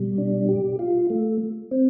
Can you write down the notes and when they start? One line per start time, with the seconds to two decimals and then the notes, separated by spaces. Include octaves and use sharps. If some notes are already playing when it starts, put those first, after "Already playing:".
Already playing: B2 G3
0.18 D4
0.48 G4
0.79 F4
1.10 A3
1.71 C4